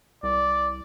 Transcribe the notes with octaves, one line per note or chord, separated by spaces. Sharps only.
C2 D5